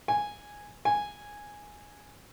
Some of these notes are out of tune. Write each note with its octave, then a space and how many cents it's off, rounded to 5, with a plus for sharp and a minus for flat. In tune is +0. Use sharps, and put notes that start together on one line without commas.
G#5 -5
G#5 -5